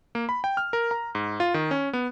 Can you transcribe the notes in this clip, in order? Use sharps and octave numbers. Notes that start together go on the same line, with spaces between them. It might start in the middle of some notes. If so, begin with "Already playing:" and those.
A#3
B5
G5
F6
A#4
A#5
G#2
F4
D#3
C#4
B3